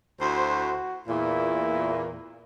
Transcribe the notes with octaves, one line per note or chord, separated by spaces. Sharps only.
D2 E4 F#4 C5
E2 A#2 E4